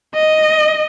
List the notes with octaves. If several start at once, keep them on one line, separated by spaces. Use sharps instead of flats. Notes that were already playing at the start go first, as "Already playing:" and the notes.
D#5